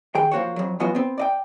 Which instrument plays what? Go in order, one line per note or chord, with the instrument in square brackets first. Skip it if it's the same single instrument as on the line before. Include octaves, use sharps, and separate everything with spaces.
[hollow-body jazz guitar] D#3 G#4 G5
F3 A#3 F#4 C5 C#5
F2 F#3
E3 F#3 B3 F4 F#4 D#5
B3 C4
D5 D#5 G5